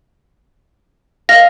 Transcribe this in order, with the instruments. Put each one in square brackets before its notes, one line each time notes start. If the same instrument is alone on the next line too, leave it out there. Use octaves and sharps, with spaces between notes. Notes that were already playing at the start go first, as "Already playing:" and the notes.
[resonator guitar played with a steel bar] D#5 F5 [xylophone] A#6